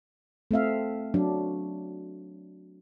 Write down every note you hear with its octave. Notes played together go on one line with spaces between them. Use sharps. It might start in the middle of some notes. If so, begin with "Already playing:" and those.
A3 C4 E5 F5
F#3 D4